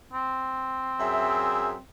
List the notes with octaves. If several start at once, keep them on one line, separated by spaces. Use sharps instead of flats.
C4
F#2 G#4 E5